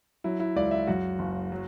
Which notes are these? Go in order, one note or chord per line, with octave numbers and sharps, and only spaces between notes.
F#3 E4
E4
C#2 D5
E5
F#2 F#4
F#1
F#3